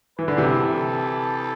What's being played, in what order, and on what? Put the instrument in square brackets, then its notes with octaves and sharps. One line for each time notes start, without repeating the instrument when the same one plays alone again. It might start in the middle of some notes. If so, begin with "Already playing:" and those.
[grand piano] E3 [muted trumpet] B4
[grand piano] D3
C3 E3
[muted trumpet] A4